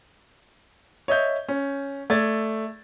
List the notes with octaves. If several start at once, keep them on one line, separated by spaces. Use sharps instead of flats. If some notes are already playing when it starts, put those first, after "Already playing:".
C#5 D#5 E5 G6
C#4
A3 D5 G#6 A6